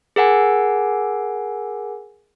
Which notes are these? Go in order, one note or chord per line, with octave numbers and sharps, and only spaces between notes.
G#4 A#4 F#5 G#5